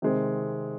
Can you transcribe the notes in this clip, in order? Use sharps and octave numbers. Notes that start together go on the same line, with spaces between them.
C3 D#3 G#3 C4